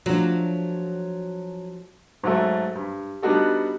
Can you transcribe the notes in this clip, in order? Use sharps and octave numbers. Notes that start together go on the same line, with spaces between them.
F3 F#3 A3 D4
G#2 F#3 A3
G2
G3 B3 D4 D#4 F#4 A4